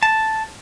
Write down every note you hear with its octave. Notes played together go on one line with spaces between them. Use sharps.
A5